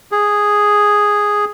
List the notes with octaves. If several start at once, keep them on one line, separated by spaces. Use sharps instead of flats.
G#4